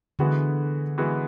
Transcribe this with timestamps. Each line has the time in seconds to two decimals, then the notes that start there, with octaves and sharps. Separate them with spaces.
0.19 D3 E3 G#3 B3 F#4
0.98 E3 G#3 B3 F#4